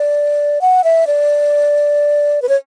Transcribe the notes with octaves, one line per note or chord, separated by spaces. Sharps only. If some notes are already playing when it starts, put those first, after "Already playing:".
Already playing: D5
F#5
E5
D5
B4
C#5